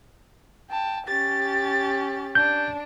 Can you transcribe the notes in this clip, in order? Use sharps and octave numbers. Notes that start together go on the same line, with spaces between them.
G5 A5
C#4 G4 A6
D4 G6